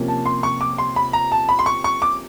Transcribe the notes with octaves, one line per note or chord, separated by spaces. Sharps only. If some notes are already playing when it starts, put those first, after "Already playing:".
Already playing: C3 F3 A#3 C#4
A5
C6
C#6
D6
C6
B5
A#5
A5
B5
C6
C#6
C#6
D6